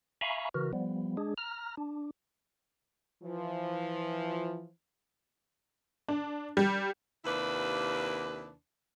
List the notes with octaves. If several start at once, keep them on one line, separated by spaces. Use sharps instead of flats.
E5 F5 G#5 A#5 B5 C#6
C#3 E3 F#4 A#4
F3 G3 B3
G#3 D4 G#4
A#5 F6
D4
E3 F3
D4
G3
D#2 C3 A#3 D4 E4 B4